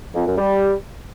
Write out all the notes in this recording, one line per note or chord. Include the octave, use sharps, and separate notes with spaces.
F2
F#2
G3